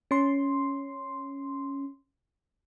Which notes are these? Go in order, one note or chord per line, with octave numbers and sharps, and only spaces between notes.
C#4 C6